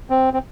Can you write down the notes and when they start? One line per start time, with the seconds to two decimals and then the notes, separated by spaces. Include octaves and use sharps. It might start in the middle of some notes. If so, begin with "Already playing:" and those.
0.10 C4
0.34 C4